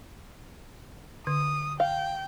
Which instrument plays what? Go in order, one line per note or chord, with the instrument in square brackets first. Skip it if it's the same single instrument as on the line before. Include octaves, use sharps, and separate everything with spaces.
[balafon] D3 [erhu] D#6
[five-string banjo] F5 [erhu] G5